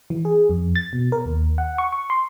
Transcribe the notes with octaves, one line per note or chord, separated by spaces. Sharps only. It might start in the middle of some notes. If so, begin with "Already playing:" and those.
E3
G#4
F2
A6
B2
A#4
D#2
F#5
C#6
C#6
C6